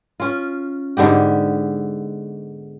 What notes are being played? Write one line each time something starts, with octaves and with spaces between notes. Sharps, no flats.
C#4 F4
G#2 D3 B3 G4